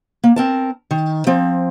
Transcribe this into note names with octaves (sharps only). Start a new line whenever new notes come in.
A#3
C4 A#4 A5
D#3
F3 C4